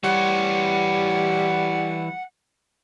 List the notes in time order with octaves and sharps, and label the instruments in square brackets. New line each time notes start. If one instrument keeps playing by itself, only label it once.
[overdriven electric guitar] E3 C#5 [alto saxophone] G3 [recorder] F#5